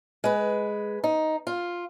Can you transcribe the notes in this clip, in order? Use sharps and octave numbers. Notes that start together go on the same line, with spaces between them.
G#3 B4
D#4
F4